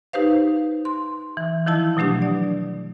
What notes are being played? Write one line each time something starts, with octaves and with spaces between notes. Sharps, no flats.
D#4 G4 B4 C5 F5
C6
E3
D#3 F3 E4 A5
B2 F#3 A3 D4 G4
D5